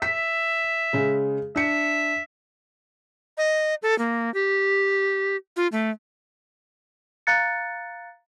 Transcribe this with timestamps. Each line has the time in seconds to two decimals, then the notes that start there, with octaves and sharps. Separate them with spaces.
0.02 E5 B6
0.93 C#3 G#3
1.56 D4 E5 C#7
3.38 D#5
3.83 A4
3.99 A#3
4.34 G4
5.56 F4
5.72 A3
7.27 F5 A#5 F#6 A6 C#7